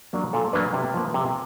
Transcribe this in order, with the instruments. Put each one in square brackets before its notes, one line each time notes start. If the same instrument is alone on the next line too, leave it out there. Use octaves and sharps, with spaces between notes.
[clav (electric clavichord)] F#3 A#3 D4
A#2 A4
F#3 A#3 D4 B4
C3
F3 A#3
C3